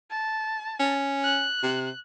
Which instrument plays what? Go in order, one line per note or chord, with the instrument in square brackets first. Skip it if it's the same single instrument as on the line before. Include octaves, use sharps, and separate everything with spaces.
[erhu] A5
[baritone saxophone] C#4
[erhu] F#6
[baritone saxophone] C3